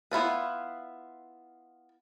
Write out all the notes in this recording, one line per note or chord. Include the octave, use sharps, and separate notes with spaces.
B3 E4 F4 B4